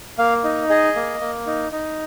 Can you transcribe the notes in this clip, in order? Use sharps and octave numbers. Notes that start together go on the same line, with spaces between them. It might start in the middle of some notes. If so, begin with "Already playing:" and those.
A#3 F5
D#4
G#4 D#5
A#3
A#3
D#4
D#4